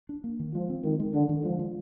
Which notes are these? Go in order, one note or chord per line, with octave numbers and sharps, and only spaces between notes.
D4
A#3
D#3
F3 G#3
C4
D#3 G#3
G#3
D3 D4
D#3
F3 G#3
G#3